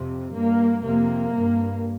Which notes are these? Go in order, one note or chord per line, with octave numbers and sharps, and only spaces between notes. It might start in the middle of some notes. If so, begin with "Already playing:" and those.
Already playing: F2 C3
G2 A#3
F2 C3 A#3
G2